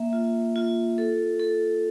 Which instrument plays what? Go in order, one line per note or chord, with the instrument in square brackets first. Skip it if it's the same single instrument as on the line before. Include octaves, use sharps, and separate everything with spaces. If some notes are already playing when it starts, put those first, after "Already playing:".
Already playing: [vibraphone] A#3 E5
F4
F4
A4
A4